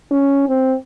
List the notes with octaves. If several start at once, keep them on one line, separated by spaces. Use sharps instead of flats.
C#4
C4